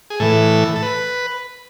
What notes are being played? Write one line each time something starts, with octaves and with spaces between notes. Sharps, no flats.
G#4
A2 E3 A4
A4
B4